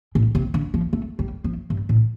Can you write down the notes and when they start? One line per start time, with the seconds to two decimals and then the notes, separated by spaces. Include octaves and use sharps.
0.15 A2
0.35 C3
0.54 D3
0.74 F3
0.93 A3
1.19 G3
1.44 F3
1.70 G2
1.89 A2